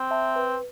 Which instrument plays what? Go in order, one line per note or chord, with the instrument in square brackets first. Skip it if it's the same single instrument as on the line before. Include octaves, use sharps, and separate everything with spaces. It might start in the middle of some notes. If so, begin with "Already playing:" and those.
Already playing: [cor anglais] C4
[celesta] E5 A5
B4